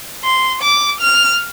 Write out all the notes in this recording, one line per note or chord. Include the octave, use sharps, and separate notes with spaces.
C6
D6
F6